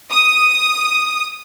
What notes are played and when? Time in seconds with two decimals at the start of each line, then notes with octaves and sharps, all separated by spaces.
0.11 D#6